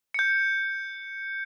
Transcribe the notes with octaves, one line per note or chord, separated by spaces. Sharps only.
G6 C#7